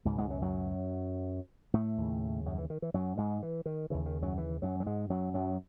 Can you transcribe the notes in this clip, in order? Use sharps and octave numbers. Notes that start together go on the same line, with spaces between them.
C#2 G#2 B2 G#3
G#2 G#3
F#2 F#3
F#2 F#3
A2 A3
D#2 C#3
F#2 F#3
E3
D#3
E3
F#2 F#3
G#2 G#3
E3
D#3
D#2 C#3 E3
D#3
F#2 F#3
E3
F#2 F#3
F#3
G#2 G#3
F#2 F#3
F#2 F#3